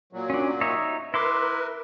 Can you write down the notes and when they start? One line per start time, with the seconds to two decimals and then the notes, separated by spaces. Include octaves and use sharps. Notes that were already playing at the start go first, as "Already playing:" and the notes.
0.13 A#2 F#3
0.30 C#4 D4
0.61 D#4 C#5 E5
1.14 E4 A#4 B4 C6 D6